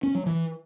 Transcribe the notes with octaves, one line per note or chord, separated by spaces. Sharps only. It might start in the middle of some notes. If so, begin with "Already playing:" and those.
C#4
F#3
E3